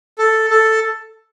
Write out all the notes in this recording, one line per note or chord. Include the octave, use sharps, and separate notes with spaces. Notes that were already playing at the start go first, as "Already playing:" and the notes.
A4
A4